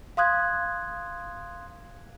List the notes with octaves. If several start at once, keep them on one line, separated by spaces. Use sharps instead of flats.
F5 C6 D#6 F#6 G#6